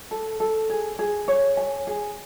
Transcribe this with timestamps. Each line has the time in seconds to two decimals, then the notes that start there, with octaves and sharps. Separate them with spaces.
0.11 A4
0.40 A4
0.70 G#4
0.99 G#4
1.28 C#5
1.57 G#5
1.87 G#4